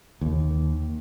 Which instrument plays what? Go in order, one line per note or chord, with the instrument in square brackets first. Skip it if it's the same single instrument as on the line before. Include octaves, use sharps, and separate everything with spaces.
[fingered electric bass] D#2